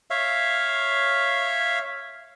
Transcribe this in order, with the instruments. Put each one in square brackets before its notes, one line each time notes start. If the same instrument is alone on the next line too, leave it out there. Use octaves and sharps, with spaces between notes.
[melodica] C#5 E5 F5